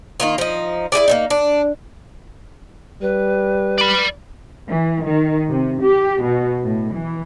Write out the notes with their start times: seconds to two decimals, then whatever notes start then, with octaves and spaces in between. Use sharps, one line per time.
0.20 D#3 A#3 F4
0.38 F3 D#4
0.92 E4 G4 G#4 D5
1.08 A#3 C4 D#4
1.30 D4
3.02 G3 B4
3.78 D5 B5
4.67 E3
5.04 D#3
5.48 C3
5.82 G4
6.22 B2
6.63 A2
6.93 E3